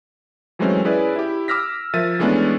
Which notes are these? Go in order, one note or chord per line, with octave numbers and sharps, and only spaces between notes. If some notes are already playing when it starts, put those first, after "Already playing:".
E3 F#3 G#3 A3 C4 C#4
C#4 E4 G#4 B4 D5
E4 G4
D6 E6 F6 A#6 B6
F3 A#4 E5 A6 D#7
E3 G#3 A3 B3 C#4 D4